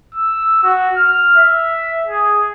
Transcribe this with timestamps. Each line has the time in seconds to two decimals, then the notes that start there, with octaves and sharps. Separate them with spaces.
0.15 E6
0.64 F#4
0.97 F6
1.37 E5
2.07 G#4